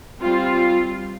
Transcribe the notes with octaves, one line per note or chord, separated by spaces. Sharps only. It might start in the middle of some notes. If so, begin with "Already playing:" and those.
G3 C4 F4